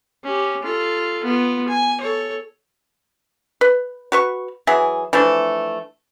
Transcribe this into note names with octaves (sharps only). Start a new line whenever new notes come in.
C#4 G4
F4 A4
B3 F4
G#5
A4 C#5
B4
F#4 B4 C#6
E3 F#3 G#4 E5
E3 F3 A3 D4